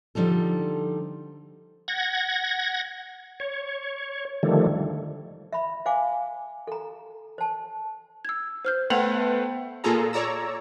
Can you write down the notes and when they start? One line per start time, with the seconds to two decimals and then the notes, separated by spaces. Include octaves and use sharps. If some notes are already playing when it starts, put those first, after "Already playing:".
0.15 D3 F3 G3 D#4 A4
1.88 F#5 G#6 A#6
3.40 C#5
4.43 D3 D#3 F3 G3 A3
5.53 E5 B5
5.86 C5 F5 G#5 D6
6.67 A4 A#5
7.38 C5 A5
8.25 E6 G#6
8.65 C5 F6 G6
8.90 A3 B3 B4 C5 F#5 G5 F7 F#7
9.84 A#2 F4 G#4 A4 A#5
10.13 C#5 D5 A#5 E6